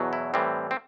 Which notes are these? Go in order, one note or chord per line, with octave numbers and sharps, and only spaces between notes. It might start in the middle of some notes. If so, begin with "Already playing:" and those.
Already playing: E2 B2 F#3
E4
A2 E3 G3 C4
C4